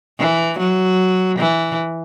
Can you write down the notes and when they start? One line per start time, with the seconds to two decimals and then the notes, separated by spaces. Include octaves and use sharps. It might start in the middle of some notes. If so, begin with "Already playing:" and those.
0.19 E3
0.59 F#3
1.39 E3